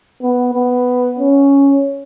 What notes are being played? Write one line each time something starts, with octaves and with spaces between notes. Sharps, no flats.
B3
B3
C#4